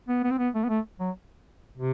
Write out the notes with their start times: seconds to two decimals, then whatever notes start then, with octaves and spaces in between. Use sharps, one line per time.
0.08 B3
0.23 B3
0.31 C4
0.38 B3
0.55 A3
0.64 B3
0.69 A3
0.99 F#3
1.77 C3